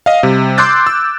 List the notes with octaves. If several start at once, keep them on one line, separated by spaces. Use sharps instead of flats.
D#5 F5
C3 G3
C6 D6 E6 F#6 G6 A6
E6